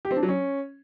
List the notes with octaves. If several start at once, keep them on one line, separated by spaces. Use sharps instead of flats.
G4
C4
D4
F#3
C#4